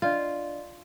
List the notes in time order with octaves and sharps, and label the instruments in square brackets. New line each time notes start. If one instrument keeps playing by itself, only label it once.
[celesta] D4 D5 D#5 [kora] F4